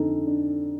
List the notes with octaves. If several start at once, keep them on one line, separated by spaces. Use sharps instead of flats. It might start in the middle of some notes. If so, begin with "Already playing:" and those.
Already playing: F2 D3 D#4 A4
D4